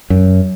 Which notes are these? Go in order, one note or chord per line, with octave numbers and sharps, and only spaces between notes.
F#2